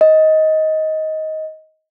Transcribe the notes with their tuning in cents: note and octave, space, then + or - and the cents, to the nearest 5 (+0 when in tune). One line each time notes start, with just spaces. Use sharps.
D#5 +15